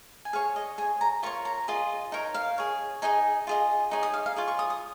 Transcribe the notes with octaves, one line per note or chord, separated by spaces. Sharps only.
G#5
G#4 C#5 F5
D#5
G#4 C#5 G#5
A#5
F4 A#4 C#5 C#6
A#5
F4 G#4 D#5
D#4 A#4 C#5
F5
G#4 C#5
D#4 G#4 D#5 G#5
F4 G#4 D#5
D#4 G#4 C#5
D#6
F5
F5
F4 G#4 C#5
C#6
D#6
D#6